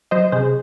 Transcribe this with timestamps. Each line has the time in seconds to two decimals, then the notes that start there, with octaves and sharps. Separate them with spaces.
0.11 F#3 C5 D#5
0.32 C3 G#4 C5